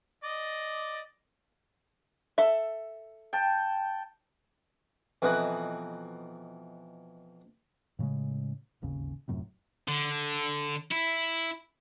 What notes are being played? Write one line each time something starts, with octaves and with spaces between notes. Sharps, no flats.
D5 D#5
A4 E5
G5 A5
F2 B2 E3 D#4 B4
A2 C#3 F3 G#3
D1 G#1 D#2 C#3
D#1 F#2 A2 C3
D3
E4